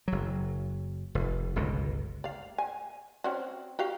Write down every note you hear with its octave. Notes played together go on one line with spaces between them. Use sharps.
F#1 F#3
F1
G1 C#2 B2
D5 F5
G#5
C4 C#4 F#4
F#4 G4 F5